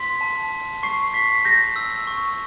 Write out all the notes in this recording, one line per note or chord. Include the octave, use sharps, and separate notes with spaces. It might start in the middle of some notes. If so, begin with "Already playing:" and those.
Already playing: C6 B6
A5
A5
C#6 C7
C#6 B6
G6 A#6
E6
C#6